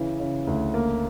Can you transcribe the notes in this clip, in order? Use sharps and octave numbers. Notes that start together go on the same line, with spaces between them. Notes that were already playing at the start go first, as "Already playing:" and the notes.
Already playing: C#3 E3
C#3
D2
A#3